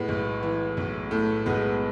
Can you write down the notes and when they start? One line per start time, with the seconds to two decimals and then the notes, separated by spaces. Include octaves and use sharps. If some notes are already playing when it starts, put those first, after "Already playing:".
Already playing: A2 G#3 B3
0.08 B1
0.43 E3
0.77 B1
1.11 A2 A3
1.46 B1 G#3 B3